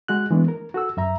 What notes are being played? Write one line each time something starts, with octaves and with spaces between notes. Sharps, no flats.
G#3 F#4 F#6
E3 G#3 A3 B3 D4
A#4
F#4 A4 E6
F#2 E5 A#5